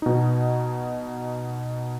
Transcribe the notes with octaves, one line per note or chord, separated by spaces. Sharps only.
B2 D#4